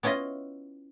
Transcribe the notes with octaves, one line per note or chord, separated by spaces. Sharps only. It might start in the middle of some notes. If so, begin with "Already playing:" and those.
B3 C#4 E4 F4 D#5